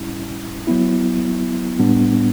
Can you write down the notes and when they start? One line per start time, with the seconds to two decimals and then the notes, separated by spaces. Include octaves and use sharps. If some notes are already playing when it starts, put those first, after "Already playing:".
Already playing: A2 G3 C#4 E4
0.67 F#3 B3 E4
1.79 A2 G3 B3 D4